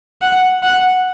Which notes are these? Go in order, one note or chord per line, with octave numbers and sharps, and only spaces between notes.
F#5
F#5